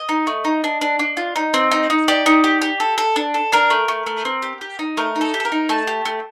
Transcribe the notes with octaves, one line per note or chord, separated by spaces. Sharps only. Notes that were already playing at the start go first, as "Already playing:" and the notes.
Already playing: D#5
D#4
A3
D#4
D4
D4
D4
F4
D#4
C4
D#4
D#4
G4 D5
D#4
G4
G4
A4
A4
D4
A4
D4 A#4
A3
A3
A3
C4
G4
G4
D#4
A3 A#4
D#4
A4
G4
A4
A#4
D#4
A3 A5
G4
A3